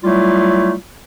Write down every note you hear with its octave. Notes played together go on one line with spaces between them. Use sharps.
F#3 G3 A3 E4 F4